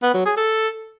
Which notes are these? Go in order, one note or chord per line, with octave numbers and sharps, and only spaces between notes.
B3
F#3
G#4
A4